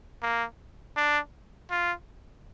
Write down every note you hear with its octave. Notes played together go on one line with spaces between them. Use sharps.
A#3
D4
F4